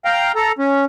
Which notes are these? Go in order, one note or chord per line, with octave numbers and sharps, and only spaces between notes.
F5 G5 A#5
A4 A#5
C#4